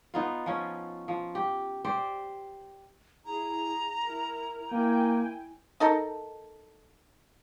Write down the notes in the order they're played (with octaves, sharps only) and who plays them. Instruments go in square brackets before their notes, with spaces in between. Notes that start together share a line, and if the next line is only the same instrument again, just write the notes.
[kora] B3 D#4 F4
F3 C#4
F3
G4
G4 C5 D5
[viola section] E4 G#4 [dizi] A#5
[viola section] E4 A#4
[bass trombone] A#3 [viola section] E4 G5 G#5
[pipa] D#4 A4 A#4